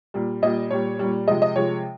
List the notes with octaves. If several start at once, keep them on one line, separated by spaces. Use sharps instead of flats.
A#2 G3
A#2 G3 D#5
A#2 G3 C#5
A#2 G3
C3 F3 G#3 D#5
D#5
C3 F3 G#3 C#5